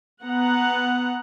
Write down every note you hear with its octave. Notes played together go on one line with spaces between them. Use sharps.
B3 F#5 A#5